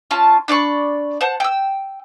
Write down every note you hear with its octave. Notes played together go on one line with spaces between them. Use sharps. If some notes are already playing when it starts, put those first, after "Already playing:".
C#4 F4 A5
D4 D5 B5 C#6
C5 F#5 A5
G5 E6